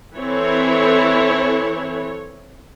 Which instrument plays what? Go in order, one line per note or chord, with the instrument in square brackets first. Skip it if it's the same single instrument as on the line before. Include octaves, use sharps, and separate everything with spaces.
[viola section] E3 C4 E4 A4 C#5